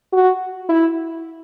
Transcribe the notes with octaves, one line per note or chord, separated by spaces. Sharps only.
F#4
E4